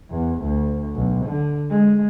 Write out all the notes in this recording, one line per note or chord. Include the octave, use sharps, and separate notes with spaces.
E2
D2
B1
D3
G#3